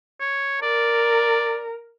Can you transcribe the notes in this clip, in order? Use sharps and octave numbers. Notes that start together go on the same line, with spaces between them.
C#5
A#4 D5